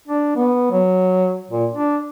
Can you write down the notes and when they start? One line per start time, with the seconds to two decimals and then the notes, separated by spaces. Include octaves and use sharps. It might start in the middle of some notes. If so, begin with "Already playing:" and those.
0.08 D4
0.36 B3
0.71 F#3
1.51 A#2
1.73 D4